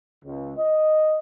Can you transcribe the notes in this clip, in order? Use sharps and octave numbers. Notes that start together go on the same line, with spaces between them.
C#2
D#5